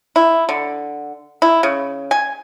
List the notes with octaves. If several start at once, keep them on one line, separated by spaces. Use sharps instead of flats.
E4
D3
E4
C#3
G#5